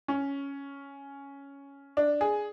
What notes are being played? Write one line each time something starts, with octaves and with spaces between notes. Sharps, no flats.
C#4
D4
G#4